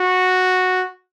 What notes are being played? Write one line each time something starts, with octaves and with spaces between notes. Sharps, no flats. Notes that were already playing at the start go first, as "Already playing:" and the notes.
Already playing: F#4